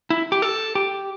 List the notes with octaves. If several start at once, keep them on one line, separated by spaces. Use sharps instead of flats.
E4
G4
A4
G4